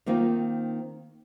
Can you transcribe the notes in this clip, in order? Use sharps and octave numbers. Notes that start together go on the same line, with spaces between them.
D#3 A#3 C4 D#4 F4